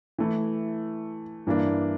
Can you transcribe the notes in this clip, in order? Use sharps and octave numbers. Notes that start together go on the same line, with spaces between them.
E3 A3 E4
G2 E3 A#3 D4